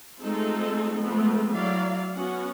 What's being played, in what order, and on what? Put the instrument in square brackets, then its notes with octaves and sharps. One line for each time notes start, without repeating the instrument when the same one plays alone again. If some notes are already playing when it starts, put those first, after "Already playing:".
[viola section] G#3 A3 C4 D#4 F4 A4
F3 G#3 A3 B3 C4
F#3 E4 D5 F5
B3 C#4 F#4 F#5